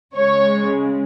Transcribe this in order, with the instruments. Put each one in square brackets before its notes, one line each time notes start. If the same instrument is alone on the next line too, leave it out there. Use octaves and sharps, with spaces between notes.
[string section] C#3 G#3 C#5